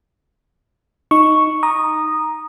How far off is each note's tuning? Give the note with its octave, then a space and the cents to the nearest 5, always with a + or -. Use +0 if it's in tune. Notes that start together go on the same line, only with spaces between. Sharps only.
D#4 +0 C#6 +0
A#5 +10 D#6 -15